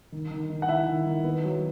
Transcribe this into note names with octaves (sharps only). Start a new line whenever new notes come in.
D#3
D#3
D#3
F#5
E4 E5
D#3
D#3
B3
F#3